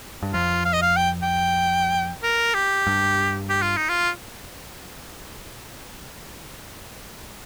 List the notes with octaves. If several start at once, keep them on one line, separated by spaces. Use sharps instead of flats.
G2
F2 F4
F5
D#5
F5
G5
G5
A#4
G4
G2
G4
F4
D#4
F4